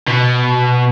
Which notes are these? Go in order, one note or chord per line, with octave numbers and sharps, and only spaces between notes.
B2